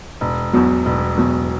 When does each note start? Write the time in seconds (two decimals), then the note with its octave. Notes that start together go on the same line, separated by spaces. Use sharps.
0.21 E1
0.53 E2 B2 F#3
0.86 E1
1.18 E2 B2 F#3